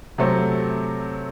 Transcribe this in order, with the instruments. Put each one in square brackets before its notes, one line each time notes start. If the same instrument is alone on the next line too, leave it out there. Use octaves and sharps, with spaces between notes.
[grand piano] C3 F#3 A3 C4